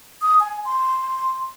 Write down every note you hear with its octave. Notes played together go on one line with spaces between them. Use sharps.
D#6
G#5
C6